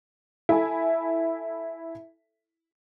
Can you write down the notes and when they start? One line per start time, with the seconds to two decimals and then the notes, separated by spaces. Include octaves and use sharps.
0.49 E4 A4 E5 G#5